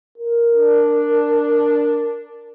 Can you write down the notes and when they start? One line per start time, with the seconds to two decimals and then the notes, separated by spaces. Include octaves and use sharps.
0.18 A#4
0.53 D4